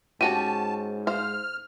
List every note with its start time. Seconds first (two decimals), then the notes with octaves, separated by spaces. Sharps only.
0.21 G#2 C#4 F#4 G4 A5 D#7
1.07 C5 F5 F6